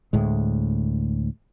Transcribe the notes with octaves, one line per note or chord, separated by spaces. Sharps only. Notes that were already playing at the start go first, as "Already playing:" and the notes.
D2 A2 G#3